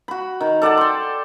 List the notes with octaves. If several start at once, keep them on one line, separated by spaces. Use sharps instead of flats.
F#4 B5
D#3
A4 D5 F#5 A5
G5 C6